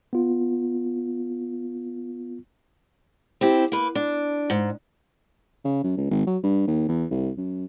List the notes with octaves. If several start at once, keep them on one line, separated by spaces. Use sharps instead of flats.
B3 F4
C4 E4 G4
A#3 B4
D4
G#2
C#3
F#2
C#2
G#1
F#3
G2
D#2
E2
C2
F#2